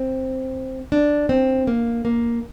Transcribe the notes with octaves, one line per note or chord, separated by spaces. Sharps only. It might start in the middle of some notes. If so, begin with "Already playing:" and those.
Already playing: C4
D4
C4
A#3
A#3